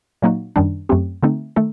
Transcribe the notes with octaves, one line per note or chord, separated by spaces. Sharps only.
A#2 F#3 A#3 D#4 F#4
F#2 D#3 G3 D4
F#2 F#3 A3 C4 G4
D3 A3 C4 D#4
D#3 A3 D#4 A4